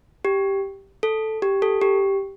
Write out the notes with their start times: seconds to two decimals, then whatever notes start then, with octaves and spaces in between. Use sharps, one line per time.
0.25 G4
1.03 A4
1.42 G4
1.62 A4
1.81 G4